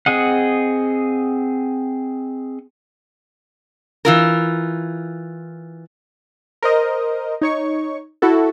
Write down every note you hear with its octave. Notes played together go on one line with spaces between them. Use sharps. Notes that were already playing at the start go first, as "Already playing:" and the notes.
C4 G#4 D#5 F#5
E3 F4 A#4
A#4 C5 D#5
D#4 C#5 C#6
E4 F#4 A4